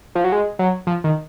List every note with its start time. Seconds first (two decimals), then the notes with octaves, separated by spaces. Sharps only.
0.15 F3
0.24 F#3
0.32 G#3
0.59 F#3
0.87 F3
1.04 D#3